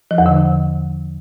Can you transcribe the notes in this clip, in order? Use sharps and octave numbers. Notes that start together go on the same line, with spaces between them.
F3
E2
D3